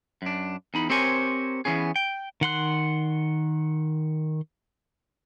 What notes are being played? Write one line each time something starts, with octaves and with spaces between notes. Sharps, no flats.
F#2 D4
E2 D#4 B5
C4 G4 A#4 C5 C#5 G#5
E3 B3 C#4 G#4
G5
D#3 F#5 C6 F#6